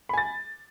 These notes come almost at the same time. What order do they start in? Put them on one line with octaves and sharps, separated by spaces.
B5 G#5 A6